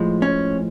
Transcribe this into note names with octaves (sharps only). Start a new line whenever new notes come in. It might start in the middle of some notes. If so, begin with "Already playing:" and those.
Already playing: A2 F3 G#3
C#4